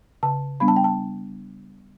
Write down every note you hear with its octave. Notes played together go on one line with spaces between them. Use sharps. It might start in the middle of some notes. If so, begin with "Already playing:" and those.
C#3 A5
G3 B3 D4 B5
A5
G5
A5